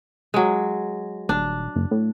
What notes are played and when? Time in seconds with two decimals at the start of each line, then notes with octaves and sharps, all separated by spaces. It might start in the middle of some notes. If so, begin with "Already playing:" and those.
0.34 F#3 G#3
1.29 D#1 D4
1.76 F#1
1.91 A2